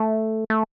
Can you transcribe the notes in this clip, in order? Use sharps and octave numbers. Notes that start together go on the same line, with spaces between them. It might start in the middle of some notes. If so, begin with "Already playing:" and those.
Already playing: A3
A3